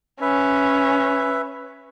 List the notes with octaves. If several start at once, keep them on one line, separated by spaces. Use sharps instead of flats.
C#4 B4 E5